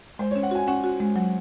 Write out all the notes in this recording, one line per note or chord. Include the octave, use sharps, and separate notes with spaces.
G#3 C5
C#4 C#5
F#5
F#4 G#5
C#4 F#5
F#4
G#3
F#3